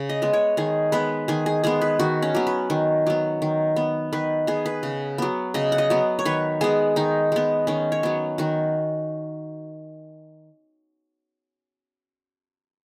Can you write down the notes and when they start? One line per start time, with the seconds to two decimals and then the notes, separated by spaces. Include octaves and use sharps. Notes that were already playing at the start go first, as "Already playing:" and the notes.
Already playing: C#3
0.09 D#5
0.22 G#3 B3
0.33 C#5
0.57 D#3 G#4
0.92 G#3 B3 B4
1.28 D#3 G#4
1.46 G#4
1.64 G#3 B3 G#4
1.81 B4
1.99 D#3 F#4
2.22 C#4
2.35 F#3 B3
2.47 B4
2.70 D#3
3.07 F#3 B3
3.42 D#3
3.76 B3
4.13 D#3 B4
4.47 B3 G#4
4.66 B4
4.83 C#3
5.18 F#3 B3
5.54 C#3 D#5
5.72 F#5
5.78 D#5
5.90 F#3 B3
6.19 C#5
6.25 D#3 B4
6.61 G#3 B3 G#4
6.96 D#3 D#4
7.32 G#3 B3
7.67 D#3 C#4
7.92 C#5
8.03 F#3 B3
8.38 D#3 F#4